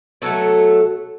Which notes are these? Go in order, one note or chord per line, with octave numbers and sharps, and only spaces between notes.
B2 F#3 A3 F#4 A4